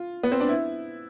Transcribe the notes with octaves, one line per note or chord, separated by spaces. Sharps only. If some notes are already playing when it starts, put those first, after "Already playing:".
Already playing: F4
B3
C4
D4
E4